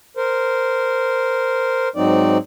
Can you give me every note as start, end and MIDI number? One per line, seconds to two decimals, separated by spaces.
0.17 1.88 70
0.17 1.88 72
1.96 2.38 44
1.96 2.38 54
1.96 2.38 60
1.96 2.38 63
1.96 2.38 74